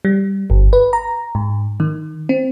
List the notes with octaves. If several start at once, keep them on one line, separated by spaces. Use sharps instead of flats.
G3
G1
B4
A#5
G#2
D#3
C4